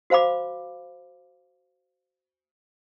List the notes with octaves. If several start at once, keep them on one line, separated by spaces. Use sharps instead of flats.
F#4 C5 F5 B5 D6